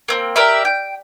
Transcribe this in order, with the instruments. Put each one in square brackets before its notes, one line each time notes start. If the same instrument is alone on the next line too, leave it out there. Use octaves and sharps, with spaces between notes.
[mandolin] A#3 C4
G4 A#4 D5 E5
G5